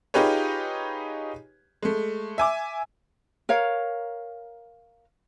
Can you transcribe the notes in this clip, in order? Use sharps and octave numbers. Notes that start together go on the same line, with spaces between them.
D#4 F4 G4 G#4 B4 C#5
G#3 A3
E5 G#5 D6
A#4 C#5 F5